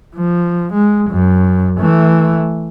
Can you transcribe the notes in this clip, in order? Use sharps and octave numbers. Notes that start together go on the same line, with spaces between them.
F3
G#3
F#2
E3 A3